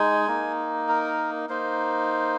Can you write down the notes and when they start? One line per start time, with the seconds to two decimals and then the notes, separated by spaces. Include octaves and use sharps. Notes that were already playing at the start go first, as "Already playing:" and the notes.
Already playing: G#3 D#4 G#5
0.28 A#3 D#4
0.88 A#4
1.49 A#3 D#4 C5